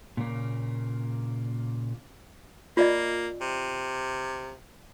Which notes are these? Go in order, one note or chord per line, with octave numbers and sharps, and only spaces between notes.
A#2 C#3 A#3
A#3 F4 D5 D#5
C3